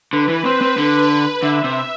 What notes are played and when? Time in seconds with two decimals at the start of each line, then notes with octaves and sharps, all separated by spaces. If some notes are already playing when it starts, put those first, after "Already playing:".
0.12 D3 B4
0.29 E3
0.46 C4
0.61 C4
0.78 D3
1.43 D3 E5
1.64 C3